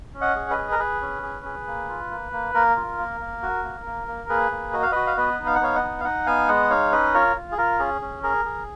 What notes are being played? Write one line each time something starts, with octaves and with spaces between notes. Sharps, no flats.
C#4
D#5 F#5
G#4
B4 D#5
G#4
A#4
G#4 B4
C#4
G#4
G#4
A#3
F4
A#3
A#3
A#3 A#4
F4
A#3
A#3
F#4
A#3
A#3
A#3
A#3 G#4 B4
A#3
F#4 D#5
F5
F#4 B4 D#5
F5
B3 B4 D#5
D#4
F5
F#5
B3 C#5 F5
D#5 F#5
D#4
F5
D#4 D#5 F#5
B3 F5 G#5
G#3 D#5 F#5
D#4 C#5 F5
C#4 B4 D#5
F4 A#4 C#5
F4
G#4
F4 A#4
C#4 G#4
C#4
G#4 A#4
G#4